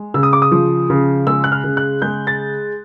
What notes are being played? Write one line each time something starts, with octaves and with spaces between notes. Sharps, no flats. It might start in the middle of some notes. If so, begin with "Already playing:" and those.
Already playing: G#3
C#3 E6
D#6
D6
D#6
F3
C#3
G#3 E6
F#6
F6
C#3
F#6
G#3 G6
A6